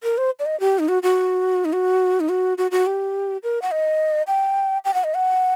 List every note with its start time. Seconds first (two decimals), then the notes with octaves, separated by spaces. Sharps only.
0.03 A#4
0.18 C5
0.39 D5
0.46 D#5
0.60 G4
0.79 D#4
0.88 F#4
1.03 F#4
1.65 D#4
1.74 F#4
2.20 D#4
2.29 F#4
2.58 F#4
2.71 F#4
2.87 G4
3.43 A#4
3.62 F#5
3.72 D#5
4.27 G5
4.85 G5
4.94 F#5
5.04 D#5
5.14 F#5